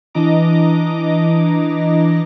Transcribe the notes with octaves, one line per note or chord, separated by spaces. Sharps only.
E3 D4 D#5 A#5 D6